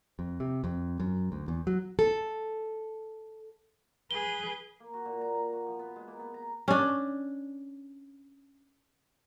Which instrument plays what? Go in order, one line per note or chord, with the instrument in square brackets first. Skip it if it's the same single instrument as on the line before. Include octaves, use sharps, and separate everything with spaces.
[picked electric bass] F2
C3
F2
F#2
D2
E2
F#3
[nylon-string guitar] A4
[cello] G#4 B4 [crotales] G7
[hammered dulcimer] A#3
F#4
A#2
A#5
A#5
F#4
F3
B3
G#3
A#3
B3
A#5
[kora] C#4 D4